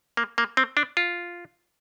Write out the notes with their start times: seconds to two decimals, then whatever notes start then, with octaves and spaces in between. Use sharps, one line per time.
0.17 A#3
0.38 A#3
0.57 C4
0.77 D4
0.97 F4